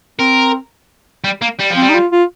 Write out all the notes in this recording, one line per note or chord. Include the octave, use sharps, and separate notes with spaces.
C4 A#4
G3
A#3
G3
F3
C4
G3
D#4
F4
F4